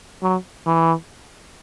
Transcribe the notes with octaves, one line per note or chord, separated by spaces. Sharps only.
F#3
E3